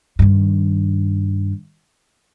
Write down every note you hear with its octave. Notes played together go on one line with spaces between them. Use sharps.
G2 D#3